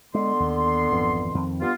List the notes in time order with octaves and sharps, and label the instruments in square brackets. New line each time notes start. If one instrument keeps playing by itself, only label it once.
[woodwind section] D3 B3 C6 [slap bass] G#3
[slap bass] D#2
G#1 F2 E3
F2 D#3 C4
[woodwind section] G2 B3 F4